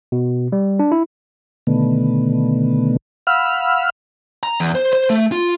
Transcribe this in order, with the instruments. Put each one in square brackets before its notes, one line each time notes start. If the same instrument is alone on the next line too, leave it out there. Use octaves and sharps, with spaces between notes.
[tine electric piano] B2
G3
D4
E4
[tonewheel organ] B2 D3 D#3 A3 B3
F5 F#5 B5 E6 F6
[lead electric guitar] A#5
E2
C5
C5
A3
F4